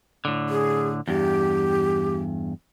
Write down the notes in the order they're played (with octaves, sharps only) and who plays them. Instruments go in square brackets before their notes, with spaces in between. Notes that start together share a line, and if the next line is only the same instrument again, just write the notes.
[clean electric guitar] A2 D3
[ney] G#4
[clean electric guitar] E2 G2 [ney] G4